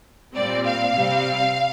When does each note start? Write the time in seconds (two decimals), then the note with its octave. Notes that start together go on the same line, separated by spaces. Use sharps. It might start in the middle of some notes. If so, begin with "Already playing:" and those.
0.35 A#2 G3 C4 D5
0.65 F5
0.95 C3 G3 C4